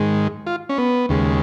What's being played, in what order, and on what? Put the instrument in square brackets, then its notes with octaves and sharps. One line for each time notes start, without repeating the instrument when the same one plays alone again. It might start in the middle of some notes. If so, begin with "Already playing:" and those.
Already playing: [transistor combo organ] G#2 D#3 G#3
F4
C#4
B3
D#2 C#3 G#3